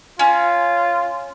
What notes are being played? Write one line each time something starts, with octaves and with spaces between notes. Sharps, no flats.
C#4 F4